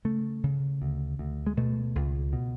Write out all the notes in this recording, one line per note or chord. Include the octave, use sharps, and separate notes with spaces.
C#3 A3
C#3
D2
D2
G#3
B2 A3
C#2
B2